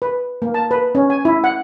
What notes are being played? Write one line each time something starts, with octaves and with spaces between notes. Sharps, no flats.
B4
A#3
A5
B4
C#4
G#5
E4
F#5